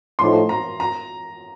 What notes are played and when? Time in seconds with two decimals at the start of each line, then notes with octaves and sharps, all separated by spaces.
0.19 A2 F3 A3 D#4 C6
0.49 A#5
0.80 A#5